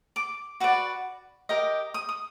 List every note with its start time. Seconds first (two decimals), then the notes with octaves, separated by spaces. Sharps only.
0.16 D6
0.60 F#4 B4 D5
1.49 G4 A#4 D#5
1.94 D#6
2.09 D#6